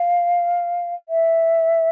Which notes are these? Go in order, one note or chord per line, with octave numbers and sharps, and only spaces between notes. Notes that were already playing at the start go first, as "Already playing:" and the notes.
Already playing: F5
E5